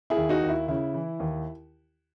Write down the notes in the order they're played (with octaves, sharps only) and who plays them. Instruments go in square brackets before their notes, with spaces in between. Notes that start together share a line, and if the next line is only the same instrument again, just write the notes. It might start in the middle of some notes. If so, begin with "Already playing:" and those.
[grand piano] E4 G#4
D#2
D#4 F#4
D#2
E4
C#3 E4
E3
D#2